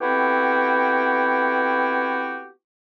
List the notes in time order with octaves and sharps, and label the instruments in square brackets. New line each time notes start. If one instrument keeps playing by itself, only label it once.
[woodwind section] A3 B3 C4 E4 F#4 G4